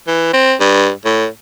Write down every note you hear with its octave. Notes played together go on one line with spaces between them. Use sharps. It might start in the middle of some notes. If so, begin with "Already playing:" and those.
E3
C4
G2
A2